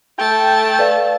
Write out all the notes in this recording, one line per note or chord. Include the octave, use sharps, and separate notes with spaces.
A3 G5 A5
B4 D5 F5